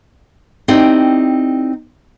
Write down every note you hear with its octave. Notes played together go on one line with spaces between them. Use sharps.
C4 D#4 E4 G4 D5 G5